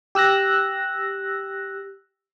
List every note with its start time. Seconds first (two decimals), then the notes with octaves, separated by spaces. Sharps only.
0.15 G4 E6 F#6 A#6